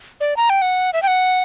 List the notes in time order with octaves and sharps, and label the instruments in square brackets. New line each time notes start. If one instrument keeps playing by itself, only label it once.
[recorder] D5
A#5
G5
F#5
E5
G5
F#5